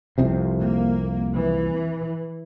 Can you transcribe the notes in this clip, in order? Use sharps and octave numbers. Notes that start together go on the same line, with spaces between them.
C2 F2 C3
A#3
E3